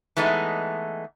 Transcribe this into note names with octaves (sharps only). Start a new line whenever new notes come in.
E3 G#3 A3 B3 D#4